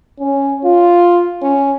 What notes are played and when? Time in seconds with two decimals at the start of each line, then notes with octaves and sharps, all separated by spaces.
0.20 C#4
0.65 F4
1.42 C#4